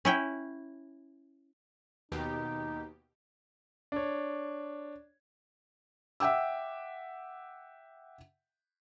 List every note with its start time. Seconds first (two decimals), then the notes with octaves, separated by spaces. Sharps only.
0.05 C#4 E4 G5
2.12 D#2 B2 D#4 G4
3.92 D4 C#5
6.20 E5 F#5 G5 D6 E6